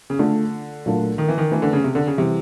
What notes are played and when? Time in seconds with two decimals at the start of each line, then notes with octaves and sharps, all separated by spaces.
0.10 C#3
0.19 D3 A3 D4 F4 A4
0.86 A#2 F#3 A3 D4 F4
1.18 D#3
1.29 E3
1.38 D#3
1.51 E3 A3 D4 F#4 B4
1.62 D3
1.73 C#3
1.84 C3
1.95 D3
2.07 C#3
2.18 C3 E3 G3 C4